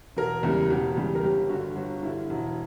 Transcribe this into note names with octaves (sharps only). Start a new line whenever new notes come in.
E1 A#4
E2 C#3 G3
E1 G4
E2 C#3 G3
A#4
G1 G4
G2 F#4
D3
G1 F#4
G2 D3 E4
E1